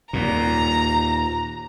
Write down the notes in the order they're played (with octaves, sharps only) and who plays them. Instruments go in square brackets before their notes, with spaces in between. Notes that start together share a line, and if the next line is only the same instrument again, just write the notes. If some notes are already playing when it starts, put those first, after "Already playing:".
[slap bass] D#2 A#2 [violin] A#5